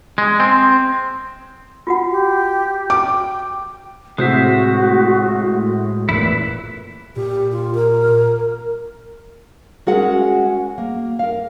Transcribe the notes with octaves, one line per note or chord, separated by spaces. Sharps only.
G#3
C4
F4 F#4 F#5
G4
G5 D6
A2 C3 G#3 F#4 C5 E5
F#1 E2 A#2 E4 B4
A#2 G4
F4
A#4
G#3 C#4 F#4 G#4 A#4 F#5
A#3
A#4 F5